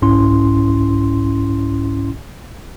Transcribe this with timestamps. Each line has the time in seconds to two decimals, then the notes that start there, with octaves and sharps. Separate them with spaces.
0.02 G1 C2 G#2 C#4 E4 C6